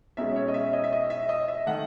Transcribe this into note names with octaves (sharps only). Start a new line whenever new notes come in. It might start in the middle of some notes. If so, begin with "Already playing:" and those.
B1 B2 G#3 C#4 E5
C#5
D#5
E5
D#5
E5
D#5
E5
D#5
E5
D#3 A3 F#5